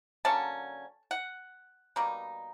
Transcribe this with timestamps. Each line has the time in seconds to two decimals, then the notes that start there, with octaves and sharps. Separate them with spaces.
0.25 D3 F#3 A#3 C#4 A5
1.11 F#5
1.96 B2 G3 A#3 D#4